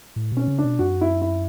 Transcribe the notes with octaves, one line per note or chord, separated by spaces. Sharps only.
A2
B2 C#4
C#3
D4
B2
F#2 F#4
E4
E4